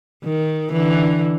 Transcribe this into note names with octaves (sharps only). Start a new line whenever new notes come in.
D#3
D3 E3